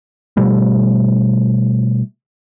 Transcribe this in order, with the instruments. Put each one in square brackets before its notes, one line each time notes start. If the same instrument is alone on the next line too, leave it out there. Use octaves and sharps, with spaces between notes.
[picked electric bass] B2 F3 G3 A3